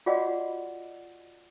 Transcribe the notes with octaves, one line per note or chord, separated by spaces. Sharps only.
F4 F#4 G#4 D5 D#5 F#5